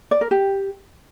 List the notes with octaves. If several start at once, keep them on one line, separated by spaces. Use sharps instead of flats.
D5
A#4
G4